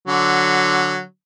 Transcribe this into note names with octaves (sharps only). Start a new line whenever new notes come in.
D3 F#3